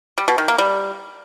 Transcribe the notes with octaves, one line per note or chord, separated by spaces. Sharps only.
G3
B2
D#3
A#3
G3